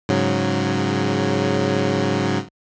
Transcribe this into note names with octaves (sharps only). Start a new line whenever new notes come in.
G#2 C#3 F#3